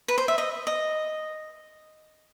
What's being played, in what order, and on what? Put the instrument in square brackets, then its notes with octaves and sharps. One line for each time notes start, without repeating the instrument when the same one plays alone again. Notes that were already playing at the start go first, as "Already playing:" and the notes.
[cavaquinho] B4
C5
E5
D#5
D#5